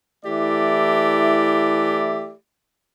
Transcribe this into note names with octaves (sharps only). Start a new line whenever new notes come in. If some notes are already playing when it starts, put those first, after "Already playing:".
E3 A3 E4 G4 D5 E5